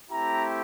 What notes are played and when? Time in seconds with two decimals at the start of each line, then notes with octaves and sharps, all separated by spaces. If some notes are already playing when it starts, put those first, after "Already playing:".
0.11 A3 C4 E4 G4 A#5